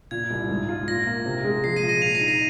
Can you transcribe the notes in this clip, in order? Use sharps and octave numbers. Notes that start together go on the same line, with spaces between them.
A#2 G#6
C2
G#2
F4
A#2 A#6
A#3
C3
G#3
F3 C7
A#6 D#7
A#2
A#6 D#7
A#2 C7 F7
A#6 D#7
D#4
A#6 D#7